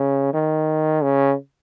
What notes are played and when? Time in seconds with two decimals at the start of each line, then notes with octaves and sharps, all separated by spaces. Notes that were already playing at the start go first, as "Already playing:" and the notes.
Already playing: C#3
0.34 D#3
1.03 C#3